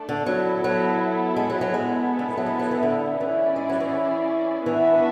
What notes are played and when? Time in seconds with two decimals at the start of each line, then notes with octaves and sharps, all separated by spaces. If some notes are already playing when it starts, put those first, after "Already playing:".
Already playing: A3 D4 A4 D5 A5
0.09 D3
0.26 F#3 B3 E4 A4
0.64 F#3
1.36 G#3
1.50 F#3
1.61 F#3
1.74 G#3 B3 E4 A4
2.19 D3
2.29 E3
2.37 F#3
2.46 G#3
2.59 F#3
2.71 E3
2.83 D3
3.20 E3 C#4 E4 G#4 D5
3.56 G#3
3.69 F#3
3.80 E3
4.66 E3 B3 D4 F#4 B4 E5